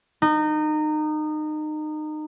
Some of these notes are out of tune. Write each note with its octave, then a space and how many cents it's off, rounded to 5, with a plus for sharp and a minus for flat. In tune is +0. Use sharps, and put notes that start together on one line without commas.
D#4 -25